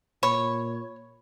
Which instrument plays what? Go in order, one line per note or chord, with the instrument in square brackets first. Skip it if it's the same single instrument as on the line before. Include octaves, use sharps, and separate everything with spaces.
[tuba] A#2 [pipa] C#5 [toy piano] B5